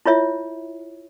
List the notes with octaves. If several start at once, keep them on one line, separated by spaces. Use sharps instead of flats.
E4 F4 C#5 E5